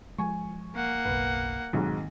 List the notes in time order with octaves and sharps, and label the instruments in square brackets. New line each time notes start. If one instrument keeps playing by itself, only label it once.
[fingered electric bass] F3 G#3 [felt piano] G#5 C#6
[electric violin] A#3 F#5
[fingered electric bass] F#1 B1 [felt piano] B4
[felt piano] B1 G#2 [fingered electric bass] D#3 A#3 C4